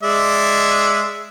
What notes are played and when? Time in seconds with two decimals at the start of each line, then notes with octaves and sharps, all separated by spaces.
0.03 G#3 D5 E5